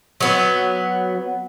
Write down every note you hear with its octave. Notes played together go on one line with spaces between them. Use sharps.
F#3 B3